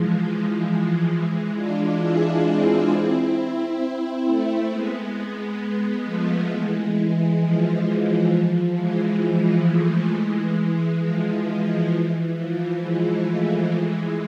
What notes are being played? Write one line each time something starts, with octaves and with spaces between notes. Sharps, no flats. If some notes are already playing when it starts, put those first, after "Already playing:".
Already playing: E3 F3 G#3
E3
F3
E3 G#3
D4 F4
E4 G#4
C4 E4
C4 E4
A3 C4
G#3 B3
G#3 B3
G#3 B3
F3 A3
E3 G#3
E3
F3
F3
E3
F3
E3 G#3
E3 G#3
F3 A3
E3 G#3
E3
F3
E3
F3
E3
F3
E3 G#3
F3 A3
E3 G#3